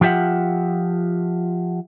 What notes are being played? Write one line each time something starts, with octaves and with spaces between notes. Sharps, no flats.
F3 F4 G4 E5 F#5